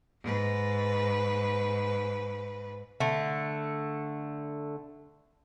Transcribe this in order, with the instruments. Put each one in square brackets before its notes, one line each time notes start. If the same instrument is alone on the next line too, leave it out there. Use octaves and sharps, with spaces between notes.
[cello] G#2 B4
[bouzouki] D3 A3